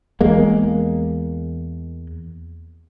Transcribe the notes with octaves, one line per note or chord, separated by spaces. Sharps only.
E2 G#3 A#3